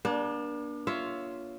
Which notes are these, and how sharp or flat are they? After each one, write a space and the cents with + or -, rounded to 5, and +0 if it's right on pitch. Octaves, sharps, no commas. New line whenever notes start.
A#3 +45 D4 +0
F4 +0 C#5 +15 E5 +0